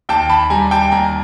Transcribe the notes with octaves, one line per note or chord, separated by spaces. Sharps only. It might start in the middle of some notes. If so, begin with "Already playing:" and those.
D#2 G5 A5
A5 B5
G3 G#5 A#5
G5 A5
D#2 G#5 A#5